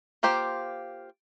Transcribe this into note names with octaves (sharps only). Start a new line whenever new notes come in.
A#3 F4 G4 C5